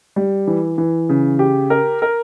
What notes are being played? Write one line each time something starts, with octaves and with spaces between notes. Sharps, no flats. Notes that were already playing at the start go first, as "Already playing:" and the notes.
G3
E3
E3
C#3
G4
A#4
A#4